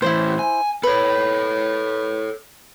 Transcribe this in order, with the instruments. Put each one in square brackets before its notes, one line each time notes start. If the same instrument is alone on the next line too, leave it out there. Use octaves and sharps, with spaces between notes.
[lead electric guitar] A2 E3 [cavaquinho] E4 C5
[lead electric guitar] G#5
[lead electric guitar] A4 C#5 [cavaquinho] B4